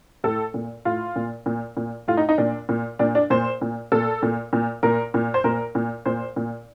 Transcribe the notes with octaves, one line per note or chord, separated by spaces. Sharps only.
A2 A4
A#2
A2 F4
A#2
A#2
A#2
A2 F4
D#4
D#4
A#2 D4
A#2
A#2 D4
D4
A#2 C5
A#2
A#2 A4
A#2
A#2
A#2 A#4
A#2
C5
A#2 A#4
A#2
A#2 C5
A#2